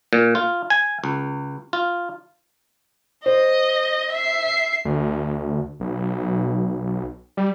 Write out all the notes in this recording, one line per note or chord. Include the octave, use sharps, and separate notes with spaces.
A#2
F4
G#5
C#2
F4
C5 D#5
E5 C7
D2
B1
G3